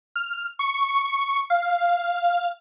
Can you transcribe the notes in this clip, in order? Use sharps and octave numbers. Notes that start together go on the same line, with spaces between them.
F6
C#6
F5